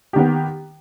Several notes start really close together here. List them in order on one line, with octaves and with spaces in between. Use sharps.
G4 D#3 B3